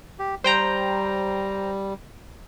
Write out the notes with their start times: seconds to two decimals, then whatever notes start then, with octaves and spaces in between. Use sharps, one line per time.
0.19 G4
0.44 G3 C5 G5 A#5